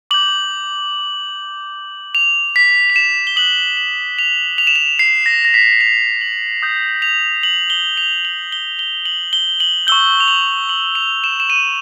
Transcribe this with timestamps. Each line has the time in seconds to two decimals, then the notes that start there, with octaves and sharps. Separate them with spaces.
0.11 D6 G6 F#7
2.15 F7
2.56 B6
2.90 F7
2.96 E7
3.27 G7
3.36 D#6 F#6 F#7
3.77 F#7
4.19 F7
4.58 F7
4.67 E7
4.76 F7
4.99 C7
5.26 A#6
5.45 A#6
5.54 B6
5.73 E7
5.81 F7
6.21 F#7
6.62 D#6 G6
7.02 F7
7.43 F#7
7.70 G7
7.97 F7
8.25 F#7
8.52 G7
8.79 G7
9.05 F#7
9.33 G7
9.60 F#7
9.87 C#6 E6 G6 G7
10.20 F7
10.28 F#7
10.69 F#7
10.95 F7
11.24 E7
11.40 E7
11.50 D#7